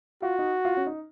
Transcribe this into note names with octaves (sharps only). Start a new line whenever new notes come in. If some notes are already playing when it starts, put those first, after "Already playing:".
F4 F#4
D#4
F4
C#4
D#4